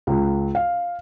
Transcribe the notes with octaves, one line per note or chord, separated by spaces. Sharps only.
C#2
F5